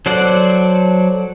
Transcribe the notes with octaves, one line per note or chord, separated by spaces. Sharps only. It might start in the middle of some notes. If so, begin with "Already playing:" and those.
F#3 A4 C5 D5 F#5